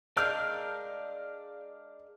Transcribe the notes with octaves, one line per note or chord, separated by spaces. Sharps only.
G#3 D4 A#4 D5 F5 F6 G6